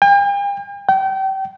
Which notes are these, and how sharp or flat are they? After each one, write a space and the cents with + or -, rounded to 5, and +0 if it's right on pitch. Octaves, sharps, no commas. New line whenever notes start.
G5 +45
G5 -30